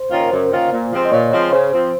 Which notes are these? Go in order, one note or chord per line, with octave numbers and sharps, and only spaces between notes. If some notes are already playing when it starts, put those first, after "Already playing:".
Already playing: C5
D#3 A#3 C#4 F4
A#4
F#2 C5
D#3 A#3 C#4 F4
A#2
F3 G#3 C4
D#5
A#2 C#5
F3 G#3 C4
C#3 C5
F3 C4